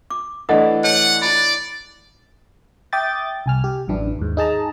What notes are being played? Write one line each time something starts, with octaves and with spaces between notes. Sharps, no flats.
D6
E3 A3 D4 D#5 F#5 D#6
C#5 F#5 A5
E4 D5 A5 B5
E5 G5 D6 D#6 G6 A6
C2 G#5 F6
G4
A1 F#2 E3 D4 E4
D#2 G#2
D#4 G#4 A5 A#5